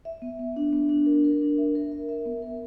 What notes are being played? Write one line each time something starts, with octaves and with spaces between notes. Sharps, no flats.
E5
B3
B3
D4
B3
D4
A#4
A#4
D4
E5
A#4
E5
E5
B3
A#4